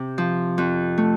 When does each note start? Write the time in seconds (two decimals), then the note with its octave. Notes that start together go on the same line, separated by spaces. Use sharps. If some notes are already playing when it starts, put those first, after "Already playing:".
Already playing: C3
0.18 F3
0.58 F2
0.98 A3